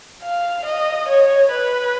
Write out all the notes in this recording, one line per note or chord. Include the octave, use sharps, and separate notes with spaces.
F5
D#5
C#5
B4